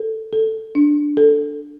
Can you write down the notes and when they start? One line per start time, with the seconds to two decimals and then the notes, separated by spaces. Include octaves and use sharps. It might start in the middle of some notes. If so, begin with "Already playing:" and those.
Already playing: A4
0.33 A4
0.75 D4
1.17 A4